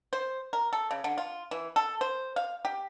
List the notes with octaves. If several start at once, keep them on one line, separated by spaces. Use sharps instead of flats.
C5
A#4
A4
C#3
D3
F4
E3
A4
C5
F5
G4